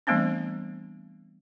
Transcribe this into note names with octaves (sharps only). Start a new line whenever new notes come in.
E3 G3 A3 B3 C4 D4